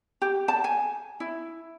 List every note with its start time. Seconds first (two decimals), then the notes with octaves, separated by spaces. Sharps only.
0.22 G4
0.48 A5
0.64 G#5
1.20 E4